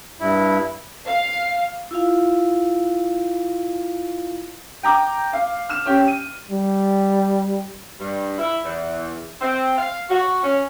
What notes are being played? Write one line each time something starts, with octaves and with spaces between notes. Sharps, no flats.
G2 E4
F5
E4 F4 F5
G5 A#5 D6
F5
F6 E7
C#4 G4
D#7
G3
G2
E4
E2
C4
F5
F#4
C#4